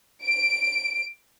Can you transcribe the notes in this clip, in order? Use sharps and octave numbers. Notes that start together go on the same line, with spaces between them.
D7